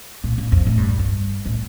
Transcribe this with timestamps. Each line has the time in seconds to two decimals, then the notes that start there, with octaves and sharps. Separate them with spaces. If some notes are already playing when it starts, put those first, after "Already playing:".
0.24 A#2
0.38 A2
0.52 F2
0.66 A2
0.77 G2
0.89 F2
0.99 G2
1.46 A2